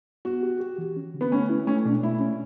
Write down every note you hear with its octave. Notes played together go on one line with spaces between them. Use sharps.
B3 F#4
G4
G4
E3
C#4
D3
B3
A3 C#4
E4
A3 C#4
B2 D4
A3 E4
C#4